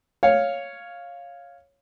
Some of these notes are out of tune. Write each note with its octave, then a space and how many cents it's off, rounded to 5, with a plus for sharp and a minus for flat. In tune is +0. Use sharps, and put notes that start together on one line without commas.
C#5 +0 F5 +0